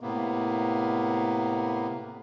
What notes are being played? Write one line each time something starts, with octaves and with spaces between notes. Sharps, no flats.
A2 C3 A#3 B3